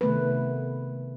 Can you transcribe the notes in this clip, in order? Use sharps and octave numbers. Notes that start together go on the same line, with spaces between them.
C3 D#3 A3 B3 B4